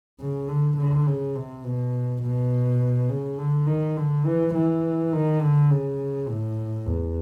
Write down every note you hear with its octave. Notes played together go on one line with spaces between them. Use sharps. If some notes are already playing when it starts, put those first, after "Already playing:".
C#3
D3
D3
C#3
C3
B2
B2
C#3
D3
D#3
D3
E3
E3
D#3
D3
C#3
A2
E2